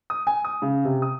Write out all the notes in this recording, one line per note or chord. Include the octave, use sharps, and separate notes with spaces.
D#6
G#5
D#6
C#3
C3
D#6